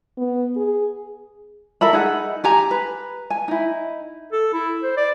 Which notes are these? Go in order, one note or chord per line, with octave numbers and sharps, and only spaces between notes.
B3
G#4
A4 A#4 E5 B5
D#4 G#4 F#5
G4 G#5 A#5
B4
G#5
D#4 E4
A4
E4
C5
D5